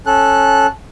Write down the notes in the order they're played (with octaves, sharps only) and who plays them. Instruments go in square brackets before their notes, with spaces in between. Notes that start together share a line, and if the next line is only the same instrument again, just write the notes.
[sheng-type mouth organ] C#4 A4 F#6